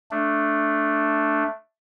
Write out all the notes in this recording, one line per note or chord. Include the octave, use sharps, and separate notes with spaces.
A3 D4